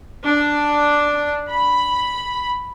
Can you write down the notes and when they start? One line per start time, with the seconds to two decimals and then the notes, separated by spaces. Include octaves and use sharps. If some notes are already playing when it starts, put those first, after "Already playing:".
0.25 D4
1.50 B5